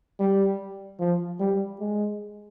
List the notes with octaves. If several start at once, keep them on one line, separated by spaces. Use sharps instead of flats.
G3
F3
G3
G#3